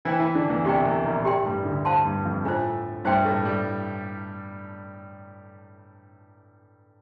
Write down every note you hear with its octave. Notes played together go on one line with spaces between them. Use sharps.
E3 D4 E4 A4 C5 G5
E3 E4
D3 D4
E2 E3
C2 C3 G4 D5 G5
C2 C3
A#1 A#2
A2 G4 D5 G5 C6
G2 G3
D2 D3
C5 F5 A5 C6
G2 G3
F2 F3
A2 A3 D4 F4 C5
G2 G3 C5 E5 G5 C6
A2 A3
G3